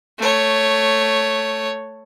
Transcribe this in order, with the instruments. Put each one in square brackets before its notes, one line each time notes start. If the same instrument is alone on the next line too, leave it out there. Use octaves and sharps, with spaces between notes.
[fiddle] A3 C#5